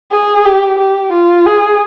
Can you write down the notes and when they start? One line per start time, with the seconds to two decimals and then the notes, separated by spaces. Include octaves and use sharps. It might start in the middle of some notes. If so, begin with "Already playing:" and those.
0.11 G#4
0.45 G4
0.79 G4
1.13 F4
1.46 G#4